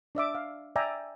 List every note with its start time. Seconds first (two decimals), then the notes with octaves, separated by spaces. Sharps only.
0.15 D4 D5 E5 D6
0.35 F5
0.76 D5 E5 G5 G#5 A#5